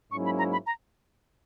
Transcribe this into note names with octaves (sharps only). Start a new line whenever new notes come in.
G#2 F#3 A#3 C#4 E4 C#6
B5
A#5
B5
A#5